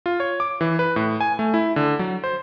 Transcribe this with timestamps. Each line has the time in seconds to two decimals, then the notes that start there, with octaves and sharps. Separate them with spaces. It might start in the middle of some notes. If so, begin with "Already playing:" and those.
0.06 F4
0.20 C#5
0.40 D6
0.61 E3
0.79 B4
0.96 A2
1.21 G#5
1.39 A3
1.54 E4
1.76 D3
1.99 F#3
2.24 C5